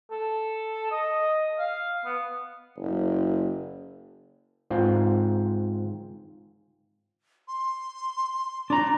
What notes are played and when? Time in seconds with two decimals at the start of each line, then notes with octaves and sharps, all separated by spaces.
0.11 A4
0.91 D#5
1.58 F5
2.05 B3
2.77 F#1
4.70 G#2 C4 F4
7.48 C6
8.70 D4 A#5